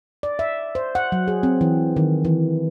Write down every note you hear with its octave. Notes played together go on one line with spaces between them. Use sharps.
D5
E5
C5
F#5
F#3
G#4
C4
E3
D#3
E3